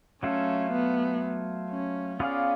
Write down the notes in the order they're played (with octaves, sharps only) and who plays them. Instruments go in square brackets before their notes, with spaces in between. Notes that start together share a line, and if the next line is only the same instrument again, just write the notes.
[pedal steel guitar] F#3 A3 F4 A4 [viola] C#4
[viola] B3
C#4
[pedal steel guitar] B3 F4 G#4 D5 F5 [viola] C#4